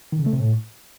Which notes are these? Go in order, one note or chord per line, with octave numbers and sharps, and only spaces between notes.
D#3
C#3
A3
C3
A2